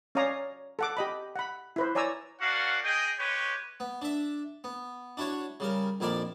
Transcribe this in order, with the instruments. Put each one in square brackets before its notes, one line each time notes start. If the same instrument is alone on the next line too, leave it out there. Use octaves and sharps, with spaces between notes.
[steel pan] C#4 C#5 D5 F5 A#5 D#6
A4 F#5 D6
G4 D#5 B5
F#5 B5
E4 B4 C5
C#5 D5 G#5 A#5 E6
[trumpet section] A#3 C#4 D4 F#4 F5 F#5
G#4 D#5 G5
G#3 G4 B4 C#5
[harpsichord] B3
D4 E5
B3
D4 E4 F#4 C#5
C#3 G3 A#4
A#1 F2 E4 A#4 D5